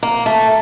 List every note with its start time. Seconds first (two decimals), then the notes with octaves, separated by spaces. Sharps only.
0.03 A#3
0.26 A3